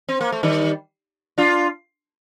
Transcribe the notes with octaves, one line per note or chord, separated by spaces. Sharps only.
C4
A#3
A3
D#3 G3
D4 F4